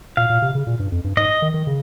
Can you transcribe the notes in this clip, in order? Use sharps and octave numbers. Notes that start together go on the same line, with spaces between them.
A#2 F5
A#2
C3
C#3
A#2
G2
F2
G2
G#2 D#5
D#3
D#3
C#3